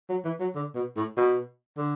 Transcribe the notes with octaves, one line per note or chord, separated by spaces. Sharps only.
F#3
E3
F#3
D3
B2
A2
B2
D3